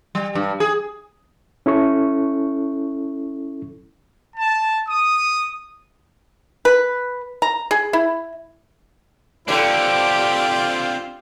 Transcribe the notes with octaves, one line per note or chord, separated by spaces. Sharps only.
G3
G2
G#4
C#4 E4 A4 C#6
A5
D#6
B4
A#5
G#4
E4
D3 C4 D4 F4 G4 B4 C5 D5